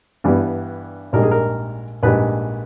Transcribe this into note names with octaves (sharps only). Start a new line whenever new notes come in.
G2 E3 G3 B3
A#1 G#2 G3 A#4
G#4
A#4
A#1 G#2 G3 B4